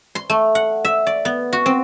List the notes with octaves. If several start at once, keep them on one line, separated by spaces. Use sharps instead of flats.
C6
A3
F#5
E5
D5
B3
F#4
C4